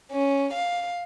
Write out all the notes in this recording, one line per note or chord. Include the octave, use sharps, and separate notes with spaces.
C#4
F5